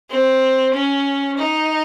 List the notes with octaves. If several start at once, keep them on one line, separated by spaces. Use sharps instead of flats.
C4
C#4
D#4